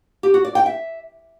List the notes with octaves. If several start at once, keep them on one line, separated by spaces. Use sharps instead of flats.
G4
F#4
D5
G5
E5